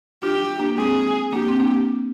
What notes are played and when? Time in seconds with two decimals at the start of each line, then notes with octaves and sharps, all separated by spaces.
0.23 D4 F4 G4
0.60 A#3 D4
0.77 G#3 C4 G#4
1.33 A#3 D4 G4
1.48 C4
1.60 A#3 D4